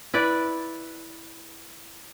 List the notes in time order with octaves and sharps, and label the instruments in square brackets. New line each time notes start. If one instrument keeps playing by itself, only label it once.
[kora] E4 B4 D5